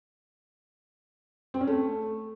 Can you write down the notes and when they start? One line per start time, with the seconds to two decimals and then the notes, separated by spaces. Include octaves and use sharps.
1.54 C4
1.61 C#4
1.67 A3